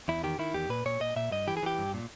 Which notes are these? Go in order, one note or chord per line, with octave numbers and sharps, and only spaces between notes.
E2 E4
D#3 G4
D#3 E4
E2 G4
A#2 B4
A#2 C#5
A#2 D#5
A#2 E5
G2 D#5
E3 G4
G#4
E3 G4
G2
A#2